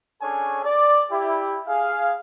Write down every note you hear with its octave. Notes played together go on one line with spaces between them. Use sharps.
C#4 D4 G#4 A4 C#5 G#5
D5
E4 G4
G#4 F5